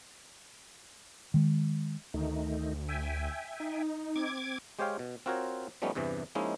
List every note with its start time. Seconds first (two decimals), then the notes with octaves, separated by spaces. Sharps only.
1.34 D#3 G#3
2.14 D2 D#3 A3 D#4
2.89 E5 G5 G#5
3.60 D#4
4.16 C4 D6 G#6
4.79 G#3 G4 C5 C#5 F5 G5
4.99 B2
5.26 C4 F4 F#4 A#4 C5 C#5
5.82 F3 G3 A3 B3 C#4 D#4
5.95 E2 G2 C3 E3
6.35 F3 G#3 A#3 C#4 D#4 E4